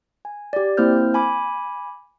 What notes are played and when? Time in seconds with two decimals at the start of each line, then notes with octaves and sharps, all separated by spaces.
0.25 G#5
0.53 G4 D5
0.77 A#3 C4 E4 C5 F6 G6
1.14 G#5 B5 D6